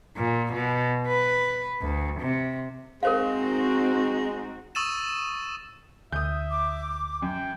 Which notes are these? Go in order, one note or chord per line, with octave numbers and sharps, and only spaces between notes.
A#2
B2
B4
D2
C3
G#3 C4 D#4 F#4 A#4 C5 F5
C#6 D#6 E6 A6 D#7 E7
D2 E5 D#6 G6
D6
F#2 G5